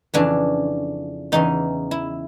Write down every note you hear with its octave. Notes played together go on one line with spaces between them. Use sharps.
F2 C#3 E3 D4
E2 C#3 E3 D#4
E4